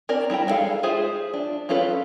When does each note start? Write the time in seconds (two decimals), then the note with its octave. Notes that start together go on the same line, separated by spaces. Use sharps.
0.09 C4 A#4 D5
0.30 G3 E4 A4 G5
0.47 G#3 D4 G#4 A4 F5
0.83 F4 G#4 C5 E5
1.34 D4
1.69 C4 C#4 F4 A4 B4